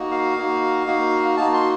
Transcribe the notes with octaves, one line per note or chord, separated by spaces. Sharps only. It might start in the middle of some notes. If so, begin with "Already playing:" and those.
Already playing: A#3 D#4 F#4
F5
A#3 D#4 F#4
A#3 D#4 F#4
A#3 D#4 F#4 A5
C6